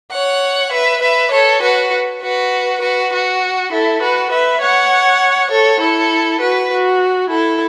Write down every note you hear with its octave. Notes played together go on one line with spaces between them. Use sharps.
C#5 F#5
B4 E5
B4 E5
A4 C#5
F#4 B4
F#4 B4
F#4 B4
F#4
E4 A4
F#4 B4
B4 E5
C#5 F#5
A4 C#5
E4 A4
F#4 B4
F#4
E4 A4